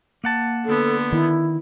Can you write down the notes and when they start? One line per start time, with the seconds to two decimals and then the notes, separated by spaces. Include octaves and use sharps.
0.24 A#3 F#5 A5
0.65 D3 B3 A4
1.12 D#3 E4